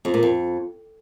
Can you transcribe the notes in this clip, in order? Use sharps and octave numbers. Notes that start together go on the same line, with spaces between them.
F2
A#2
F2